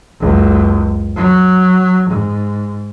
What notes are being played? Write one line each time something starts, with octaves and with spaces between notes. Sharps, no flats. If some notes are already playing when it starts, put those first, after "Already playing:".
F#1 C#2
F#3
G#2